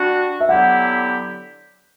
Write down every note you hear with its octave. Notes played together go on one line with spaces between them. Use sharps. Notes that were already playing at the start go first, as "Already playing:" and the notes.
Already playing: G3 D4 F#4
E5
D3 F#3 B3 E4 G4 F#5